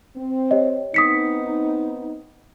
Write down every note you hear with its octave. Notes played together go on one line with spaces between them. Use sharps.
C4
G4 C#5 D#5
B3 C4 D#4 D#6 B6 C#7